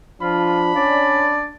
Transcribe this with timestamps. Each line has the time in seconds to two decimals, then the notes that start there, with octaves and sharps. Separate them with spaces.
0.22 F3 D4 F4 B5
0.76 C#4 D5